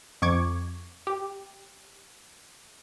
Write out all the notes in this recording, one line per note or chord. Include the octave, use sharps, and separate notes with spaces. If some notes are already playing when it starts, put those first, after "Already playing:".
F2 C#6 D6 G#6
G4